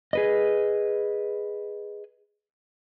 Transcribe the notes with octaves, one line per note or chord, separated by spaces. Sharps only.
G#4 B4 D#5